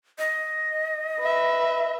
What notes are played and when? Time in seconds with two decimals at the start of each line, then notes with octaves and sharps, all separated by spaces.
0.18 D#5
1.19 B4 E5